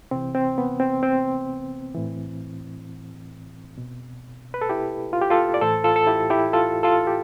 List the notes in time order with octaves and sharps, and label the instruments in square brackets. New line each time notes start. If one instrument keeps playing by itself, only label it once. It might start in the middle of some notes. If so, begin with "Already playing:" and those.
[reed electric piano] C3 E3 C4
C4
B3
C4
C4
A2 E3
B2
B4
A4
E4 G4
F4
G4
F4 A4
D5
A2 E3 A4 C5
F4 A4
A4
E4 G4
E4 G4
F4 A4
F4 A4
G4